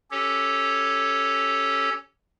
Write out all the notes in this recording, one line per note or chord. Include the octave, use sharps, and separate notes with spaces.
C#4 G4 A4 C#5